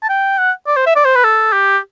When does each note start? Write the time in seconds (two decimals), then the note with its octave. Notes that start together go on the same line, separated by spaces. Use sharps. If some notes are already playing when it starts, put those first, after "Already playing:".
0.03 A5
0.09 G5
0.38 F#5
0.67 D5
0.77 C5
0.86 E5
0.96 D5
1.05 C5
1.15 B4
1.24 A4
1.53 G4